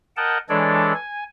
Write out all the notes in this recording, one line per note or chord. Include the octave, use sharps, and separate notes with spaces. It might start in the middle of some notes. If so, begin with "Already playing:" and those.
A#4 D#5 F#5 G5 A5
E3 G#3 D4 A4 C#5 D5
G#5